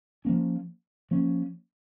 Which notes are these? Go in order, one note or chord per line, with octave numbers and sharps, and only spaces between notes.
F3 A#3 C#4
F3 A#3 C#4